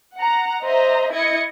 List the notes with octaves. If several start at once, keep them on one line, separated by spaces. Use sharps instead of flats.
F#5 A#5
C5 D#5 E5 A#5
E4 D#5 G#6 C#7